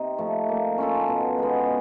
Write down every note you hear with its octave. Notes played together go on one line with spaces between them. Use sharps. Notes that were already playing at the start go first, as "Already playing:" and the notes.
Already playing: C3 C4 D#4
F3 A3
A#3
C#4 F4 A4
B2
G#3 B3